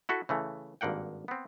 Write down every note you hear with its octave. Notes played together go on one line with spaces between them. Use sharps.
E4 F#4 A4 E5
C#3 E3 A3
G#1 G2 A#3 F#5 G5
B3 C4